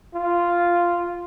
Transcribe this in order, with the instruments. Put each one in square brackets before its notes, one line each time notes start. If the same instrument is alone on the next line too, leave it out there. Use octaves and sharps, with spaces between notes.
[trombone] F4